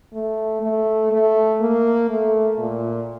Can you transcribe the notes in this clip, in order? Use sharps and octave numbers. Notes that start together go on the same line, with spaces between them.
A3
A3
A3
A#3
A3
A#2